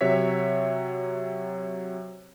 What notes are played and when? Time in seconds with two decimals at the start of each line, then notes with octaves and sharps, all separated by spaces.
0.01 C3 F#3 C#5 E5 B6